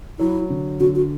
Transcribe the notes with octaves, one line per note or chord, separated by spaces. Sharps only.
F#3 E4
D3
D3 F#4
F#4